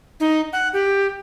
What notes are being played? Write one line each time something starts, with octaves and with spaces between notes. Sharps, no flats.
D#4
F#5
G4